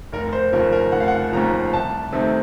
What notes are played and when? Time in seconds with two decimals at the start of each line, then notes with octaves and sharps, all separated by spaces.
0.12 F1 A#4
0.33 C5
0.52 D#2 C#3 F3 A#4
0.73 A#4
0.92 F1 F#5
1.00 F5
1.08 F#5
1.32 D#2 C#3 F3 A#5
1.73 C2 A5
2.13 C3 D#3 A3 C4